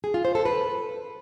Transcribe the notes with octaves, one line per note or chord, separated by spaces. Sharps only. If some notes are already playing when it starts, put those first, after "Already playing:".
G#4
F4
C5
A4
B4